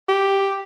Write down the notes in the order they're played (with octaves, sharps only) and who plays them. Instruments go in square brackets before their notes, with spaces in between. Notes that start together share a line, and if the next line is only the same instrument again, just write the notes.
[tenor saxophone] G4